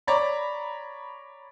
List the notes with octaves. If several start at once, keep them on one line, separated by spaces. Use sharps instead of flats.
C#5 D5 A#5 B5